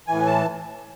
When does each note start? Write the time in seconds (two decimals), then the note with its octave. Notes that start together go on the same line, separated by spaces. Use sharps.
0.07 A2 E3 G#5
0.26 A5